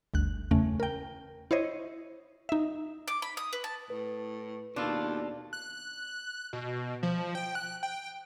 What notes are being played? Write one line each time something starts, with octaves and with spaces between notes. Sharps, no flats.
G1 D2 F#6
E2 C#3 A3 C#4
A#4 G5
E4 C5 C#5 D#5
D#4 E5
D6
B5
D#6
B4
A5
A2 B4
D#2 B2 D4 F4 A4
F#6
B2
F3
G5
F#6
G5